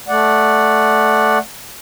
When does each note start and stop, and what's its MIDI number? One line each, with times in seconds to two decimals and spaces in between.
0.08 1.38 57
0.08 1.38 74
0.08 1.38 78